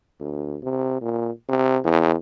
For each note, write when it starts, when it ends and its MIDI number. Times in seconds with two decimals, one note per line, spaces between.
0.20 0.58 38
0.63 1.00 48
1.02 1.30 46
1.49 1.79 48
1.84 2.14 40